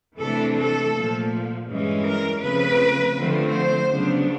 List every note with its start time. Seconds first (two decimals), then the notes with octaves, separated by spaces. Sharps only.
0.19 C3 E3 A3 D4 A4
0.56 A4
0.94 A#2 F3 A3
1.68 G2 E3 G#3 C#4
2.05 A#4
2.42 C#3 F3 A3 C4 B4
3.17 D3 F3 A3 C4
3.53 C5
3.90 C#3 F#3 B3 D4